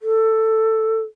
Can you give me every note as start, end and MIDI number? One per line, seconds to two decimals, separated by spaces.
0.01 1.00 69